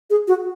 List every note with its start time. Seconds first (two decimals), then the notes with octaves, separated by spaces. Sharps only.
0.10 G#4
0.28 F#4